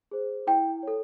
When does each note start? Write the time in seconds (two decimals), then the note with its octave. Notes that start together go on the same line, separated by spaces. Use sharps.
0.11 G#4 C5
0.47 E4 G5
0.83 A4 C#5